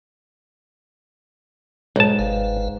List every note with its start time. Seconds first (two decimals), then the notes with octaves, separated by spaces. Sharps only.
1.96 B1 G#2 A5
2.19 G1 B4 F5